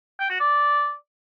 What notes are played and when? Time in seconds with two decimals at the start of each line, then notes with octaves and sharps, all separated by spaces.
0.20 G5
0.30 F#4
0.40 D5